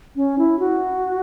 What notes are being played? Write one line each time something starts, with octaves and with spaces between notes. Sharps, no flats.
C#4
E4
F#4